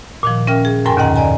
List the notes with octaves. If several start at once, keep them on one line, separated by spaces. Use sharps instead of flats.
A#2 D#3 F3
C#4 A#4 E5 G5 F6
G#4
F#2 A2 A#4 G5 G#5 C6
D#2 D3 C#4 D#5 F#5 A#5
D5 D#5 G#5 A#5